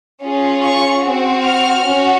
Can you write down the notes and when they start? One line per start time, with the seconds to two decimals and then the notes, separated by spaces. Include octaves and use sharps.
0.23 C#4 F4 G#4
0.63 C#6
1.03 C4 F#4
1.44 F6
1.84 C#4 F#4